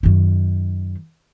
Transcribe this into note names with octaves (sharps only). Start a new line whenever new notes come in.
F#2 D#3